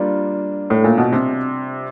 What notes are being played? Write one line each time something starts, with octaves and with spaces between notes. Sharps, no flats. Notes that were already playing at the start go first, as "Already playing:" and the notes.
Already playing: G3 A#3 D4 F4
A2
A#2
B2
C3